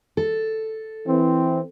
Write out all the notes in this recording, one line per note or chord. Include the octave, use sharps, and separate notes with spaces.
A4
E3 C4